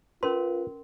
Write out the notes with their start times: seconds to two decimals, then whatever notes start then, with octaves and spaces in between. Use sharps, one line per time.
0.23 C#4 F4 A#4 B4 C6